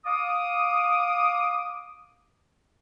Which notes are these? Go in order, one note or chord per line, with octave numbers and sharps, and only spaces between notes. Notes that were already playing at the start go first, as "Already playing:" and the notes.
F5 D6 D#6